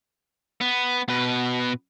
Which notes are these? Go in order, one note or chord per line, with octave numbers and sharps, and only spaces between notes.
B3
B2 B4